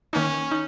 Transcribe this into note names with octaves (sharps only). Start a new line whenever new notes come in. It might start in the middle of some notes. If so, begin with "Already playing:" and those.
D#3 A#3 C#4 D#4
D#4